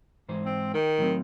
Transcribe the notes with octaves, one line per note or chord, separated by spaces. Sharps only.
G#2 E3 C5
C4
D#3 G5
A2 F#3 C4